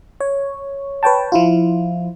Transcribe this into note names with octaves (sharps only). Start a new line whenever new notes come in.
C#5
B4 C#5 G5 A5
F3 E4 F4